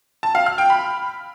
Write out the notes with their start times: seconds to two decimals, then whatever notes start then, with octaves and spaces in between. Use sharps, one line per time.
0.23 A5
0.35 F5
0.46 F6
0.58 G5
0.70 B5